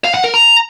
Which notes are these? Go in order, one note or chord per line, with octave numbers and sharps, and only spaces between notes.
F5
F#5
A#4
A#5